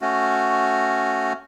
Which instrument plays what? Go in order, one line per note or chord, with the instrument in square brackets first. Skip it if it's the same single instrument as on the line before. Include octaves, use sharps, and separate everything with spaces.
[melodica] A3 C#4 F#4